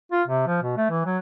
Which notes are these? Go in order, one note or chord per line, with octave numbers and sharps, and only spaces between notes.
F4
C3
F3
B2
A3
E3
F#3